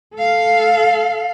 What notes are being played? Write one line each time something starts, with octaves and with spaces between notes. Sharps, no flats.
A4 F5